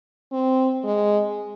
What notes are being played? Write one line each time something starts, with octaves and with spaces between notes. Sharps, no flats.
C4
G#3